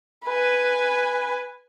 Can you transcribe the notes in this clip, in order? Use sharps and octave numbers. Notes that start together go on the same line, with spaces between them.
B4 G#5